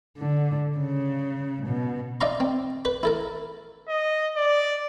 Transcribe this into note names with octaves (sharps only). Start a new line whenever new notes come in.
D3
C#3
B2
D#4 D5 E5 F5 A#5 C6
C4
B4 B5
E4 A4 A#4
D#5
D5